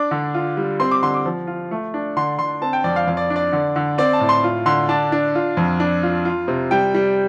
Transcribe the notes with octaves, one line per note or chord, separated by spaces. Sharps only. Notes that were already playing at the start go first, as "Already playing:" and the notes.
Already playing: D4 D6
D3
F4
G3
C4 C6
D6
D3 C6
D6
F3
F4
A3
D4
D3 C6
D3 C6
C4 A5
G5
F2 D5
F5
F2 F5
D5
D4
D5
D3
D3
C4 D5
A5
A2
C6
F4
D3 C6
D4 A5
D4
F4
F2
D4
F4
F4
C3
G3 G5
G3